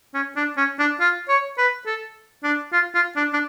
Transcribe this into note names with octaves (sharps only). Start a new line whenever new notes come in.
C#4
D4
C#4
D4
F4
C#5
B4
A4
D4
F4
F4
D4
D4